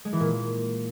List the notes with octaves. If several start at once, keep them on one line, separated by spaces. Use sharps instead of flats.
G#3
E3
A#2